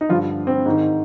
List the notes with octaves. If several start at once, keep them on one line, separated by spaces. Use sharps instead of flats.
D#4
G2 D3 F3 F4
C4
G#2 D#3